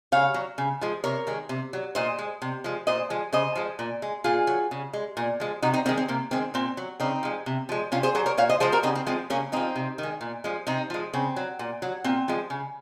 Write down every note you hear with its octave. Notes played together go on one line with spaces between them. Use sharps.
C#3 C#5 F5
F#3
C#3
F3 G#3
C3 A#4 C#5
D#3 G#3
C3
F#3
A#2 C5 D#5
G#3
C3
F3 G#3
A#2 C5 D#5
F3 G#3
C#3 C5 D#5
F3 G#3
A#2
G#3
A#2 F4 G#4
F#3
C#3
G#3
A#2
F3 G#3
C3 D#4 F#4
C4 D#4
D#3 G#3 C4 D#4
C4
C3 A#3
D#3 G#3 C4
A#2 C4
F#3
C#3 C4 D#4
F3 G#3
C3
F3 G#3
C3 C#4 F4
G#4 C5
F#3 G#4 C5
A#4 C#5
A#2 C#5 F5
C5 D#5
F3 G#3 G#4 C5
F#4 A#4
C#3 C4 D#4
C4
F3 G#3 C4
C#3 A#3 C#4
F3 G#3 C4 D#4
C3
D#3
G#3
A#2
F3 G#3
C3 C4 D#4
F3 G#3
C#3 C4
F#3
A#2
F#3
A#2 C4
F3 G#3
C#3